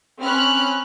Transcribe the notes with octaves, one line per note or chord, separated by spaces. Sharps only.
C4 C#4 B5 F6 F#6